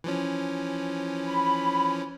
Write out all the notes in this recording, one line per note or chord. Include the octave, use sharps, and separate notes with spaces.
E3 F3 C#4
B5